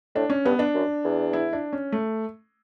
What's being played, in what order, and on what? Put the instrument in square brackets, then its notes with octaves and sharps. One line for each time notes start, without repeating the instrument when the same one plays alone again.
[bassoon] A2 [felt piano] D4
[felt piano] C#4
[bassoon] G2 [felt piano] B3
[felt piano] D4
[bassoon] F#2
E2
[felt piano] E4
D4
C#4
A3